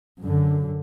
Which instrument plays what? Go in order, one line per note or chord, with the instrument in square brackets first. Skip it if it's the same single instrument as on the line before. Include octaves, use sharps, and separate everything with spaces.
[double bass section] F#2 D3